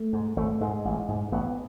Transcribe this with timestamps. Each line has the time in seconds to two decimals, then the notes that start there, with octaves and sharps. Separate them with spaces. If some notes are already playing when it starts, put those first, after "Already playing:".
Already playing: A3
0.13 G#2
0.37 G#1 A3
0.61 G#2 G#3
0.85 A1
1.08 G#2
1.32 A1 B3